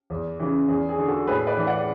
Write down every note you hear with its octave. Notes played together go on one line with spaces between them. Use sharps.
E2
C#3 E3
E2 G#4
G#4
D3
F#4 A4
A2 G#4 B4
B4 D5
E3
D5 F#5